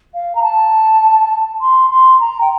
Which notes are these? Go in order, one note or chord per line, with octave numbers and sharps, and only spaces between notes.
F5
A#5
A5
C6
C6
A#5
G5